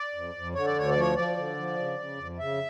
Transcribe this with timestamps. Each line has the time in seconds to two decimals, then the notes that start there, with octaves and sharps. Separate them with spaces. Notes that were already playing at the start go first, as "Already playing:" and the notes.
Already playing: D5
0.14 F2
0.35 F2
0.54 D3 C#5
0.66 D5
0.76 D2 C#5
0.89 D5
0.96 F3 C#5
1.16 F3 D5
1.37 D3
1.57 F3
1.77 C#3
1.99 C#3
2.18 F2
2.39 C#3 E5